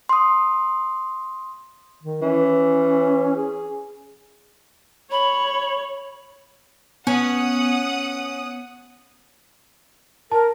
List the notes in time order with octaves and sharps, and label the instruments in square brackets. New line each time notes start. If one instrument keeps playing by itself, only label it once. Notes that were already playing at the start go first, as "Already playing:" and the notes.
[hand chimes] C6 D#6
[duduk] D#3
[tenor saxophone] E3 [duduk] C#4
[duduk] G#4
[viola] C#5 [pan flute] B5
[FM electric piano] B3 [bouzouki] C#4 [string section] F#5 D#6
[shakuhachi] A#4 [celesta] A5